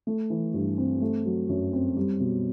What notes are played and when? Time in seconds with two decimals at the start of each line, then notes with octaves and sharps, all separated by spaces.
0.07 A3
0.30 E3
0.54 G2
0.78 C4
1.01 A3
1.25 F#3
1.49 F#2
1.73 C4
1.96 G3
2.20 B2